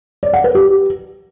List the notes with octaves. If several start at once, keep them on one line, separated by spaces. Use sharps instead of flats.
D5
F#5
B4
G4